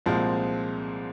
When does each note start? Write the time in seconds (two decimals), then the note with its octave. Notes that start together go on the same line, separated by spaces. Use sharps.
0.06 C2 A#2 F3 G#3 C4